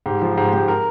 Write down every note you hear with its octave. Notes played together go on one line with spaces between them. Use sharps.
G#2 G4
F3
G#2 G4
G#2 G4
A#4